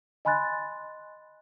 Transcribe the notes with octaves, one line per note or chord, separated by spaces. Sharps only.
D#5 G#5 B5 C6 F#6 A6